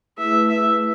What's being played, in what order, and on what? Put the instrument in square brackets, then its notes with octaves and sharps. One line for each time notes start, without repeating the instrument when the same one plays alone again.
[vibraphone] A3 E4 G#4 B4 [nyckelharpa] E5
[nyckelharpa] E5